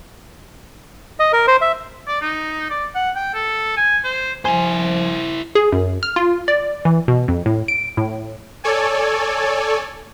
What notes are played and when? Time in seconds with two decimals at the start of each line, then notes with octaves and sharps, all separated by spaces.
1.20 D#5
1.33 A#4
1.48 C5
1.62 E5
2.07 D5
2.21 D#4
2.70 D5
2.95 F#5
3.16 G5
3.34 A4
3.77 G#5
4.04 C5
4.45 F3 E4 C5 G#5
5.55 G#4
5.72 F#2
6.03 F6
6.16 F4
6.48 D5
6.85 E3
7.08 B2
7.28 F2
7.46 A2
7.68 D7
7.97 A2
8.64 A4 C#5 D5 G#5